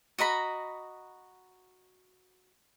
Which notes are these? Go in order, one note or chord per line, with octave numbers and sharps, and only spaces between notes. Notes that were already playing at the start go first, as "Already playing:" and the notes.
F#4 D#5 A#5 B5